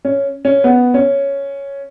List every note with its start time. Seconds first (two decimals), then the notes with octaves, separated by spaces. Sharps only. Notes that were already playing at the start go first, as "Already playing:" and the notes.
0.05 C#4
0.45 C#4
0.64 B3
0.94 C#4